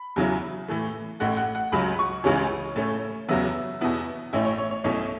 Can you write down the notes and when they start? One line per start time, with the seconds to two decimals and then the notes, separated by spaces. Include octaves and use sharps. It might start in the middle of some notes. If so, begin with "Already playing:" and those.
Already playing: B5
0.16 E2 C#3 F#3 C#4 E4
0.68 A2 E3 A3
1.20 A1 A2 A3 F#5
1.37 F#5
1.55 F#5
1.72 C#2 C#3 F#3 B5
1.99 C#6
2.24 C#2 C#3 E3 C#5
2.76 A2 A3 C#4
3.29 E2 C#3 F#3 B3 E5
3.81 E2 B2 B3 E4
4.33 A1 A2 A3 C#4 E4 E5
4.45 C#5
4.58 C#5
4.71 C#5
4.84 B1 B2 A3 C#4 E4 C#5